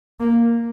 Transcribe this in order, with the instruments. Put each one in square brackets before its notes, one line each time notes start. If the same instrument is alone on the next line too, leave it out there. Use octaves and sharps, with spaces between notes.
[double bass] A#3